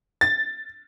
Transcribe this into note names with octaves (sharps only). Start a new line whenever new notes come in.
A6